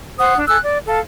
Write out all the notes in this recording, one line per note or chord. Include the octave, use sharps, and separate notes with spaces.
C5 F#5 D#6
D4
A4 G#5 E6 F#6
D5
A4 F5 A5